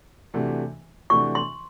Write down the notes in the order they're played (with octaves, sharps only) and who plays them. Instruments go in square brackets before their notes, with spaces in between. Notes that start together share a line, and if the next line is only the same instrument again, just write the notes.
[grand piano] C3 E3 A3 D4 F#4
[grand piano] C3 E3 A3 D4 F#4 [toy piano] C#6
[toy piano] C6